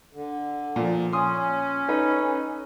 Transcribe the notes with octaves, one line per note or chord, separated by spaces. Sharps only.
D3
A#2 F3
C#4 C6 D#6
D#4 A4 B4